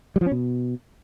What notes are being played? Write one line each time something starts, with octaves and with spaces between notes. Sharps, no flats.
G3
F3
C#4
B2